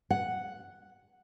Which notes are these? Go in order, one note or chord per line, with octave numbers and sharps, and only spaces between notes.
F#5